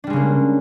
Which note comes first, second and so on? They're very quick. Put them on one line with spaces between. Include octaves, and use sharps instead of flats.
D4 G3 G#3 C#3 A#3